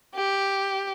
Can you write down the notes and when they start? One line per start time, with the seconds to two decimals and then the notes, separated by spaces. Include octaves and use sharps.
0.15 G4